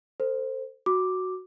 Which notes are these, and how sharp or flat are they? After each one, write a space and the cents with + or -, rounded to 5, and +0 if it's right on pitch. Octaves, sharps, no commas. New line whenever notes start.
A4 +35 C5 +0
F#4 +0 D6 +0